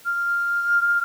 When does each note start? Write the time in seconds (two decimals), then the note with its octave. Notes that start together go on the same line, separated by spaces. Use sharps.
0.05 F6